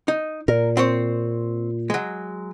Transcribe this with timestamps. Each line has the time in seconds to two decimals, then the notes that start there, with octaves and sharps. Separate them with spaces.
0.08 D#4
0.48 A#2 A#4
0.77 C4 C5 C#5
1.90 F#3 G#3